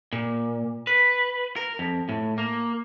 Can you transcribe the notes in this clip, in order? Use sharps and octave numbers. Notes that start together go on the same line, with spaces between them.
A#2
B4
A#4
F2
A2
A#3